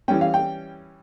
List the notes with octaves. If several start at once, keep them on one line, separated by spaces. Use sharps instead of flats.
E3 G3 C#4 G5
F5
G5